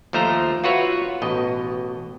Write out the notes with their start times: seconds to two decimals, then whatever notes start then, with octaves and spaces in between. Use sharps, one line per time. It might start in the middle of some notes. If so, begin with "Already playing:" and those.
0.13 D#2 F3 A3 C5 A#5
0.64 F4 F#4 B4 C#5 E5
1.22 A1 B2 D#5